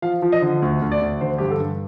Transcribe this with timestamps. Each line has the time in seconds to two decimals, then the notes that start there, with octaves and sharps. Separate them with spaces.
0.02 F3 F5
0.22 F3
0.32 D#5
0.42 D3
0.62 D2
0.82 D2
0.92 D5
1.01 D2
1.21 D3 C5
1.38 G2 G4
1.51 A4
1.60 G2